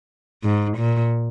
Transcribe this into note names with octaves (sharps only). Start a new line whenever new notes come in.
G#2
A#2